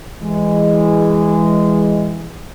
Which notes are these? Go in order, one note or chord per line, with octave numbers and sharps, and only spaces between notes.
E3 G#3